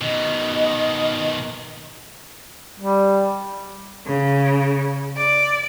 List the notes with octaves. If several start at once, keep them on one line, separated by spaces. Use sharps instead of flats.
B2 D#3 D#5
G3
C#3
D5